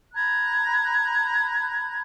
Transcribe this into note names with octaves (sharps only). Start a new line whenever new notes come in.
A#5 B5 F#6 G#6